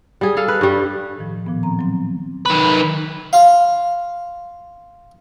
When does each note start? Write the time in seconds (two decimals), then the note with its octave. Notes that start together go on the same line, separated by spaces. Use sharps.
0.21 G3 G#4
0.37 G#4 A4 F5
0.48 B4
0.61 G2 G3
1.17 A2 D#3 F3
1.46 A#2 F3 B3
1.63 C4 A#5
1.79 F#3 C4
2.46 D#3 B4
3.33 F4 F5